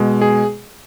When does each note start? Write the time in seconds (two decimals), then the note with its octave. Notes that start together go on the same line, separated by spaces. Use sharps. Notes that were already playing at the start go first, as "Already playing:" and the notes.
Already playing: B2 G#3
0.22 G#4